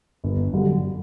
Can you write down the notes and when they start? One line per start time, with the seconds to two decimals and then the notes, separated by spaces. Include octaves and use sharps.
0.24 G1
0.53 F#2 D3 G3